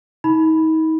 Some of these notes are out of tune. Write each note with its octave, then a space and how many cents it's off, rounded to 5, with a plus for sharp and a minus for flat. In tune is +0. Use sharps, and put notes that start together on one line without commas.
D#4 +35 B5 +0